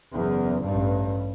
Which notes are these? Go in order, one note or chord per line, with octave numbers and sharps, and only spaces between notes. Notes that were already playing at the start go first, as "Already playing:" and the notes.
F#1 E2
A1 G2